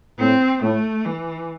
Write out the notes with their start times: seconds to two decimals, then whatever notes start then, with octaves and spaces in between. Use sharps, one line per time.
0.19 A2 C4
0.62 A2 A3
1.05 E3